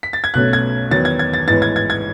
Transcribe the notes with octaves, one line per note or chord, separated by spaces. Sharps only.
B6
A6
G#6
B1 B2 A3 C#4 F#6
G#6
E2 D#3 F#3 B3 A6
G#6
G#6
A6
A1 G#2 E3 B3 D#4 A6
G#6
G#6
G#6